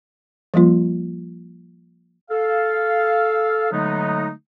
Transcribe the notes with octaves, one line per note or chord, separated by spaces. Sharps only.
F3 G3 A#3 F4
A4 F5
D3 F#3 G#3 A3 B3 D#4